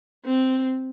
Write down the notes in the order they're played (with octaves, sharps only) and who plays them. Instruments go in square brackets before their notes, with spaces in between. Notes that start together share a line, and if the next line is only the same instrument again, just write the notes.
[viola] C4